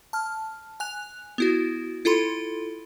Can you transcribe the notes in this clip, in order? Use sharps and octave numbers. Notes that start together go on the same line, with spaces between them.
A5 F6
G#5 F#6 F7
B3 E4 F#4
E4 F4 A4 B5 C6